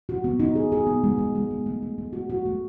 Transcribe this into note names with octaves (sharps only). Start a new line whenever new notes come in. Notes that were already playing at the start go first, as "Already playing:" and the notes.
F#4
B3
D#4
G#4
G#4
B3
G#3
G#3
G#3
B3
A3
A3
A3
F#4
F#4
A3